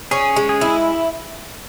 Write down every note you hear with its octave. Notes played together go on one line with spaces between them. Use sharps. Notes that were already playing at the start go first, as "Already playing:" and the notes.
C#4 G#4
G#3
G#4
E4